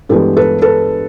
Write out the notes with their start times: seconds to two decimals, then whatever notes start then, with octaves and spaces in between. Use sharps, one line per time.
0.09 G2 E3 G#3 B3 G4 A4
0.37 A4 B4
0.62 A4 B4